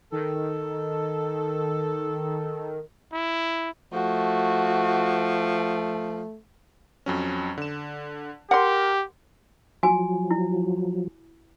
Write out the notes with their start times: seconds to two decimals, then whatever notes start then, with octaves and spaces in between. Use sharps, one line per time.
0.12 D#3 A4
3.13 E4
3.93 F3 A3 F#4
7.06 F2 F#3 C#4
7.58 D3 E7
8.51 G4 A#4 F#5 C6
9.83 F3 F#3 F#4 G#5
10.31 E4